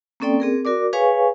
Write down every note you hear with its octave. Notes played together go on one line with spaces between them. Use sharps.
A#3 C4 C#4 A4 D5 G5
C4 G#4 A#4
F#4 A#4 D5 D6
G#4 B4 C#5 F5 G#5 C#6